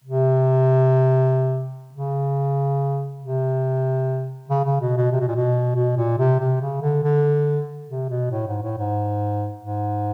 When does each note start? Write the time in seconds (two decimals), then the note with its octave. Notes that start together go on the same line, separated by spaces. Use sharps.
0.04 C3
1.94 C#3
3.22 C3
4.50 C#3
4.65 C#3
4.81 B2
4.97 B2
5.12 C3
5.20 B2
5.28 A#2
5.35 B2
5.76 B2
5.97 A#2
6.19 C3
6.40 C3
6.62 C#3
6.82 D3
7.04 D3
7.88 C3
8.09 B2
8.31 A2
8.47 G#2
8.62 A2
8.78 G#2
9.58 G#2